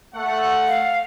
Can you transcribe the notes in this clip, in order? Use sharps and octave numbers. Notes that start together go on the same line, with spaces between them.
A3 F#5
F5